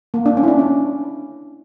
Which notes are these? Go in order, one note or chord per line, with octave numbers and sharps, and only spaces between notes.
A#3
D4
C#4
E4
D4
C#4